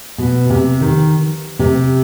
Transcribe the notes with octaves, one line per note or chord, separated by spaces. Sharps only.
B2
C3
D#3
C3